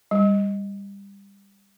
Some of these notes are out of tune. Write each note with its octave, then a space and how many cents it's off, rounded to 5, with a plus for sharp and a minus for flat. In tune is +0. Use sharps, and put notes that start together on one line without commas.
G3 +25